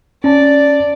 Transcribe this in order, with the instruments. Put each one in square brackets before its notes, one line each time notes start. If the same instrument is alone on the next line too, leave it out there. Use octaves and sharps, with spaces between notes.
[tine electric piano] C#4 A5 [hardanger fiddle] D5